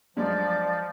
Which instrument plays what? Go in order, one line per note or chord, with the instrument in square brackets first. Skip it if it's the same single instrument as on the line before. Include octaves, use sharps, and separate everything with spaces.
[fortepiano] G2 F#3 G#3 [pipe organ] F3 [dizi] D5